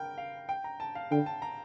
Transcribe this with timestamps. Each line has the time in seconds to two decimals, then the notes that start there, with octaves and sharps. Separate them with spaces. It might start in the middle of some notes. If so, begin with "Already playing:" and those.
Already playing: A#4 G5
0.18 F5
0.49 G5
0.64 A#5
0.80 A5
0.95 F5
1.11 D3 G5
1.26 A5
1.42 A#5